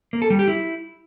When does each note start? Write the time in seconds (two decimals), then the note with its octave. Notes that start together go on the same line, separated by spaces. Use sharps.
0.13 A#3
0.22 A4
0.30 G3
0.39 G4
0.48 E4